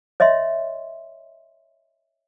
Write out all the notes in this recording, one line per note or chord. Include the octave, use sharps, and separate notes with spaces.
C#5 D#5 E5 C6